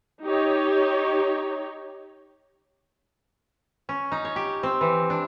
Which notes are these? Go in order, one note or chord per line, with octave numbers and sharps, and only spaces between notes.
D#4 G4 C#5
C#4
D#4
C#5
G4
C4
E3
D4